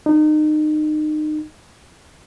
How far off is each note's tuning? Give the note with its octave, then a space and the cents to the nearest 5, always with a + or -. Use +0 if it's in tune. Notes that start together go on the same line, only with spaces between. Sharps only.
D#4 -30